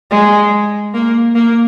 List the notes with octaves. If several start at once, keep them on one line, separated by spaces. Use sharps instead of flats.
G#3
A#3
A#3